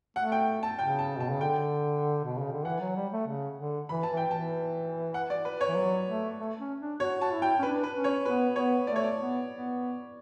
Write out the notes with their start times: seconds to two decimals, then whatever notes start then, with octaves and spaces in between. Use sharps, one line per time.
0.16 A3 F#5
0.32 G5
0.63 A5
0.79 C#3 G5
0.99 A5
1.19 B2 A5
1.30 C#3
1.41 D3 G5
2.25 B2
2.39 C#3
2.52 D3
2.65 E3 F#5
2.80 F#3
2.96 G3
3.12 A3
3.27 C#3
3.58 D3
3.89 E3 B5
4.03 A5
4.11 E3
4.17 G5
4.31 E3 A5
5.14 F#5
5.30 D5
5.45 B4
5.61 C#5
5.68 E3
5.76 F#3
6.08 A3
6.39 A3
6.59 C#4
6.81 D4
7.00 F#4 C#5
7.21 F#4 A5
7.31 E4
7.42 G5
7.59 C#4
7.62 D4 B4
7.83 B4
7.94 C#4
8.04 C#5
8.25 B3 B4
8.56 B3 C#5
8.87 A3 D5
8.96 C#5
9.03 D5
9.18 B3
9.50 B3